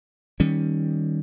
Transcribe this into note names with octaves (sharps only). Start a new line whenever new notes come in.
D#3 G3 C#4